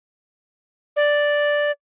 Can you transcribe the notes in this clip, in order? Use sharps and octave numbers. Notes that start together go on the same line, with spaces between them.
D5